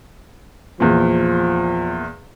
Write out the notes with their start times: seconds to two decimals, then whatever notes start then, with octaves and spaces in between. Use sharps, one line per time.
0.80 E2 A#2 F3